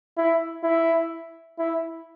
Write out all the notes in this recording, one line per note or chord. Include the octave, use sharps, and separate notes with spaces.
E4
E4
E4